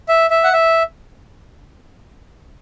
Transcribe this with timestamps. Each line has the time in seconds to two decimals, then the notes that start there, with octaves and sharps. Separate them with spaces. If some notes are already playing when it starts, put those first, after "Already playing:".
0.08 E5
0.30 E5
0.44 F#5
0.53 E5